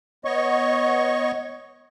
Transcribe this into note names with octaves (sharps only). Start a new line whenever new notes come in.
B3 C#5 D#5 C#6